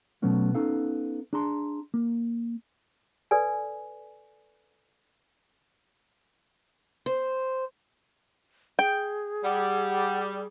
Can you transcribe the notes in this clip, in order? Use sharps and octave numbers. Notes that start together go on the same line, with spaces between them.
B2 F#3 A3 B3 C#4 F4
B3 C#4 D#4 A4 F5
D4 G#4 A5 A#5 C6
A#3
A4 B4 D5 G#5
C5
G#4 G5
G3 F#5